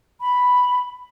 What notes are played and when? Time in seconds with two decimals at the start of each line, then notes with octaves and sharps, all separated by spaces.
0.21 B5